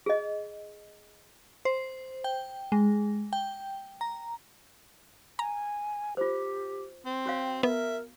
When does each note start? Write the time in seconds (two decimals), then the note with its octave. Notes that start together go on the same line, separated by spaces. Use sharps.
0.06 G#4 D#5
1.65 C5
2.24 G5
2.72 G#3
3.33 G5
4.01 A#5
5.39 G#5 A#5
6.17 F4 G4 C5
7.05 C4
7.26 F#4 C#5 F5 G5
7.63 B3 A#4 E5